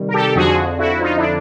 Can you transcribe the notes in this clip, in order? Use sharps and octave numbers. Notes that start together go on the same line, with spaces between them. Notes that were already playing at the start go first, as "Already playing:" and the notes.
Already playing: C3 D#3 G3
A#4
G4 A4
F2 D3 F3 F#4 G#4
E4 F#4
D#4 F4
D4 E4